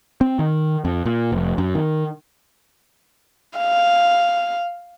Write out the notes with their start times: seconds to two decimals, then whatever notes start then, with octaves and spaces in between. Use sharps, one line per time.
0.21 C4
0.39 D#3
0.85 F2
1.06 A#2
1.32 F1
1.58 F#2
1.75 D#3
3.58 F5